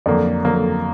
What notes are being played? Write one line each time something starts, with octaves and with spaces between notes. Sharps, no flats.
F2 D3 F#3 A#3 D5
F2 D3 F#3 A#3